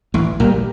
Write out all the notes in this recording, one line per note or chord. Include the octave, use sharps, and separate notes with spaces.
A1 A2 E3
A#1 A#2 G3 A#3